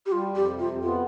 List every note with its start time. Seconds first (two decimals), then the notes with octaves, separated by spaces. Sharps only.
0.06 G4
0.12 G3 F4
0.30 F2
0.35 G4
0.47 C3
0.59 F4
0.64 F2
0.83 B3 F4